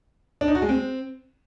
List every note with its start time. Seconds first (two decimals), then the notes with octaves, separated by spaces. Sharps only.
0.41 D4
0.48 D#4
0.55 F#4
0.62 G#3
0.69 C4